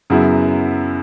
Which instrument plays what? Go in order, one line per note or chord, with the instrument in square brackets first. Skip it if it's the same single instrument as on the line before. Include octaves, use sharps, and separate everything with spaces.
[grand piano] F#2 C#3 F#3 B3 E4